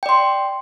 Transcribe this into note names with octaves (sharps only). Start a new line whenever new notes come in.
D5 G5 C6